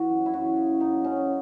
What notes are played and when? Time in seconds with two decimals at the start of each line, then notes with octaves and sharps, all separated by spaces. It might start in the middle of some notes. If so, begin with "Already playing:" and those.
Already playing: E3 F#4
0.09 F#2
0.26 E4
0.34 F#2 F#4
0.57 C#3
0.80 F#2 D#4
1.04 F#2 C#4